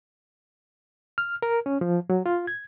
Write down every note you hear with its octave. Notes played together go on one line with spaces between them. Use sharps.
F6
A#4
C#4
F3
F#3
F4
G#6